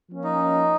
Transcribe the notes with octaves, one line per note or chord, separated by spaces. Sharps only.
F3 A#3 C#4
D#4